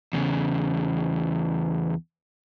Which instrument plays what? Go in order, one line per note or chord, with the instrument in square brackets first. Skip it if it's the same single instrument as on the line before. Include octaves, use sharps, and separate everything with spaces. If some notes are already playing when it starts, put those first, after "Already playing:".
[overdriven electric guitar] E2 C#3